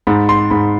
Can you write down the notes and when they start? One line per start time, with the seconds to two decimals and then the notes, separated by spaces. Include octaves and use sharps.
0.07 G#2 B5
0.29 C6
0.50 G#2 B5